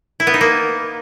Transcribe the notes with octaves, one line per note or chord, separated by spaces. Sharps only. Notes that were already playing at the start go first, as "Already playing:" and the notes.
E4
B3
D#4
A#3